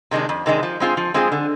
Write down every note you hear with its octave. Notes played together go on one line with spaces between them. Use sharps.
C3 D#3 G#3 D4
F2
C3 D#3 G#3 D4
F3
G#3 C4 F4 G#4
F3
G#3 C4 F4 G#4
D3